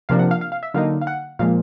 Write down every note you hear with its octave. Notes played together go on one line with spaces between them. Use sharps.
C3 F3 A#3 D4 F5
F#5
F5
F5
F5
E5
D3 F#3 A#3 D#4 F5
F5
F#5
A#2 F3 G#3 F5